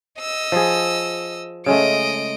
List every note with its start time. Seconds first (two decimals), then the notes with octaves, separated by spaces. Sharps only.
0.20 D#5 E6
0.52 F3 G#4
1.66 C#3 G#3 A3 D#5 D7